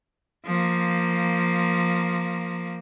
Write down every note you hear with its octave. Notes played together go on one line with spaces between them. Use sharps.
F3 A#3